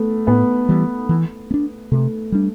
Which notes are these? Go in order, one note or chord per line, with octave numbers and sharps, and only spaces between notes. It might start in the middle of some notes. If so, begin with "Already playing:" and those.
Already playing: A3 B3
A2 B3
E3 G3
E3
B3
D4
C3 A3
G3 D4